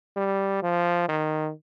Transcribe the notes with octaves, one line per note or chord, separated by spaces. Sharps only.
G3
F3
D#3